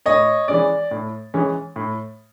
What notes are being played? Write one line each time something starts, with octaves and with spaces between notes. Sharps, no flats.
A2 C#5 D#5
E3 G#3 C#4 D5
A2
E3 G#3 C#4
A2